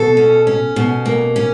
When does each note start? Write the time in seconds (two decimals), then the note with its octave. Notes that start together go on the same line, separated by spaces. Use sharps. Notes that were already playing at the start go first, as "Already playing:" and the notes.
Already playing: B2 A4
0.17 C#4
0.47 C#4
0.76 B2
1.06 A#3
1.36 C#4